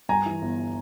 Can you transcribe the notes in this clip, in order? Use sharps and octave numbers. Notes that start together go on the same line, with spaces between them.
G2 G#5 A#5
E3
G1